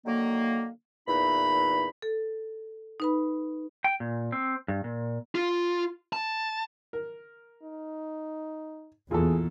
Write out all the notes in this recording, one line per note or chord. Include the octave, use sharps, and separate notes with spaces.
D3 D#3 F#3 A#3
E2 A#2 E3 D#4 B5
A4
D#4 B4 B5
G5
A#2
C4
G2
A#2
F4
A5
A#4
D#4
E2 A#2 E3 G#4 A4